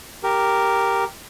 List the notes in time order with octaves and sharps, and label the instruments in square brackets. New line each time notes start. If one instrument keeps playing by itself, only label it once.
[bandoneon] G4 A#4